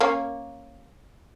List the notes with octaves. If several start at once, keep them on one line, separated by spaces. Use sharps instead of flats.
A#3 C#4